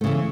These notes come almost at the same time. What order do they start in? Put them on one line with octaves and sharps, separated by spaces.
A3 C#3 E3